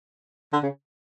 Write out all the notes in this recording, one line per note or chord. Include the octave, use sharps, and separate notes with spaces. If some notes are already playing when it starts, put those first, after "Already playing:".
D3
C#3